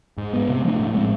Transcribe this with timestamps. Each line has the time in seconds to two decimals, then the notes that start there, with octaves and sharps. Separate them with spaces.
0.18 G#2
0.33 G#3 B3
0.48 C3
0.64 F3 A3 D4
0.79 A2
0.94 G#3 C4